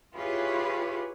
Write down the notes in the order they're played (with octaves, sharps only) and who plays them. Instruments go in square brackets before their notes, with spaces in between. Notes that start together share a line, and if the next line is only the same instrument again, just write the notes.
[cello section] E4 F4 G4 G#4 B4 C#5